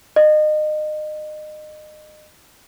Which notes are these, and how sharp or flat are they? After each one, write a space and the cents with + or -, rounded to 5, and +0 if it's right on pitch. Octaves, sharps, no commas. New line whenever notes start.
D#5 -30